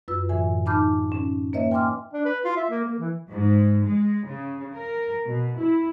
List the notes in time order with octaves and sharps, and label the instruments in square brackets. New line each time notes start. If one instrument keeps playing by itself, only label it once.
[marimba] F#2 F4 B4 E6
A2 D3 E3 E5 G#5
D#4 A5 B5 D6 F6 G6
C#4
A#3 B4 C#5 D#5 E5
G5 G#5 C6 D6 F6
[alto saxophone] D4
B4
F4
E5
A#3
A#3
E3
[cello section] G#2
G#3
C#3
A#4
B2
E4